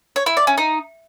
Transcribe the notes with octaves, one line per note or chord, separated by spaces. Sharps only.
C#5
E4
D5
C#4
D#4